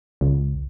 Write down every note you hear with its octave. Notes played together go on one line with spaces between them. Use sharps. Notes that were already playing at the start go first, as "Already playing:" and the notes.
C#2